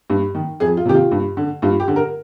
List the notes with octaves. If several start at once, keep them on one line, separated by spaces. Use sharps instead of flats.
G2
D#3
F2 G#4
F4
C3 D#3 G4
F4
G2
D3
G2 F4
G4
D3
A#4